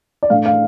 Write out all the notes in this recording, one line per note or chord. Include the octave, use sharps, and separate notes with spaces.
D5
A2 A3 D4 F5
F5